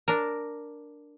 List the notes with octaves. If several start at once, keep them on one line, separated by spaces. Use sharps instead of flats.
D4 A#4